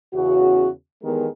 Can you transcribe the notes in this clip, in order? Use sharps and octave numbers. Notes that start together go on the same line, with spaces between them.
E2 C#3 F#4
E2 D#3 G#3 B3 G4 A#4